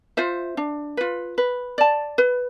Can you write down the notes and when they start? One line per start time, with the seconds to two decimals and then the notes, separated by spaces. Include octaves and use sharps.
0.17 F4 C5 E5
0.57 D4
0.97 F4 B4
1.38 B4
1.78 D5 A5
2.18 B4